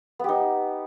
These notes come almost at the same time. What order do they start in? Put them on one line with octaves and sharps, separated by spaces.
B3 G4 D#4